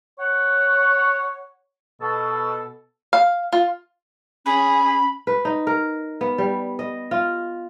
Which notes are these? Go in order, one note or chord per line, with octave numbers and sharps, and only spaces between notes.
C#5 F#5
B2 A4
F5
F4
C#4 G#4 B5
B4
D#4
A#4
B3
G3
D#5
F4